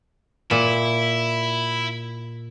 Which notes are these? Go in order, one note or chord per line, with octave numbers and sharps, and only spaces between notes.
A#2 E4